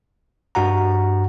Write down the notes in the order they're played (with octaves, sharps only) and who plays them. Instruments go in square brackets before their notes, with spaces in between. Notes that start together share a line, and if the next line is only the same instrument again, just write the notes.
[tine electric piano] G2 F#4 F#5 A#5